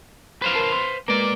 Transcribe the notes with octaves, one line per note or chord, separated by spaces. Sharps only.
B4 C5 F5
A#4 A5
C6
G#3 A#3 B4 D5